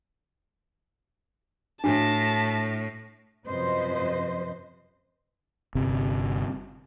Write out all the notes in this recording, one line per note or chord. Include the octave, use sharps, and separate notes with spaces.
A2 D4 F#4 A5
F#2 C3 F3 B4 C5 D#5
G1 C3